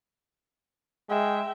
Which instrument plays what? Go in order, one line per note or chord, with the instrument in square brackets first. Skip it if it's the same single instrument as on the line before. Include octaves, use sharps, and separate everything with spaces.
[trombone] G#3 [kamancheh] E5 G5